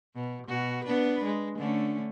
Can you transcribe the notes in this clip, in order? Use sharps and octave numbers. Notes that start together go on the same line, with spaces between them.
B2
B2 F#4
B3 D4 B4
G#3
D3 A3 C#4